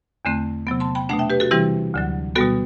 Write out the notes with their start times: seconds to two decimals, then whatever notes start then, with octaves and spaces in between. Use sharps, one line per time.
0.25 E2 D3 A3 C4
0.67 C3 F#3 B3
0.80 A5 C6
0.95 G5 B5
1.09 B2 A3 D4 F#5 A5
1.19 E5 G5
1.30 G4 B4
1.40 F#4 A4
1.51 C3 E3 G3 C4 E4 G4
1.94 D2 D3 F#3
2.35 B2 G3 B3 F#4 A4